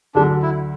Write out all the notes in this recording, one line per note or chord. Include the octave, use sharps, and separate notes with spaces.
D2 D3 F#3 D4
E4